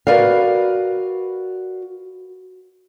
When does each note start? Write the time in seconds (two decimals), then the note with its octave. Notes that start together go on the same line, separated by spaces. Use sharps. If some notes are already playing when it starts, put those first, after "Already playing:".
0.07 F#4 A#4 B4 D5 F5